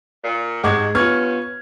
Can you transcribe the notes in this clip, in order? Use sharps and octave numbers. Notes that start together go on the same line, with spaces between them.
A#2
G#2 C3 G#3 F#5 C#6 D6 G#6
G2 B3 C#4 F4 C#6 F6 G#6